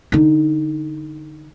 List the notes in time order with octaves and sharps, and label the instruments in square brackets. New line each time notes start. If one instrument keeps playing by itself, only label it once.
[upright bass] D3 D#4